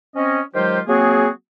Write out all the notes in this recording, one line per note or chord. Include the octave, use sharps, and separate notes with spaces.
C4 C#4 D#5
D#3 F#3 G#3 F4 G4 C5
F#3 A#3 C4 F#4 G#4